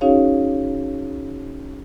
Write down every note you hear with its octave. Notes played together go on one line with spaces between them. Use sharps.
C#4 D#4 F#4 G#4 C#5 F5